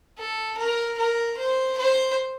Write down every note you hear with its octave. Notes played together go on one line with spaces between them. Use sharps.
A4
A#4
A#4
C5
C5